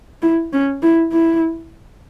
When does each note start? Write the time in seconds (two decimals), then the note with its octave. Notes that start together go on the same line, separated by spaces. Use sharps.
0.22 E4
0.53 C#4
0.83 E4
1.12 E4